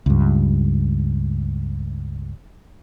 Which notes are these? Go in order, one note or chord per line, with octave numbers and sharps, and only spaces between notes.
C#2 G2